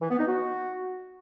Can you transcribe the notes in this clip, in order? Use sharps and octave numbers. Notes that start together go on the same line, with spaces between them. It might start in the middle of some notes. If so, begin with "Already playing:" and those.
E3
B3
D#4
F#4